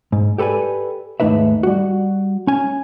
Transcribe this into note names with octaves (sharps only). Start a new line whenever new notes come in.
G#2
G4 A4 B4 D5 G#5
D#2 G#2 A3 D#4 B4 E5
G3 F#4
C#4 G#5